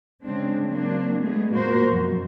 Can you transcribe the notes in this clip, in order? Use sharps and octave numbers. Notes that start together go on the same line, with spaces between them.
C#3 G#3 C4 D4
F#3 A#3 C4 D4
G#3 A3 B3 G#4
A#2 A#3 F#4 A#4 C5
F#2 B2 F3